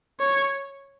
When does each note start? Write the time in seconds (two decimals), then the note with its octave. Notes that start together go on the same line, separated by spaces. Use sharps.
0.20 C#5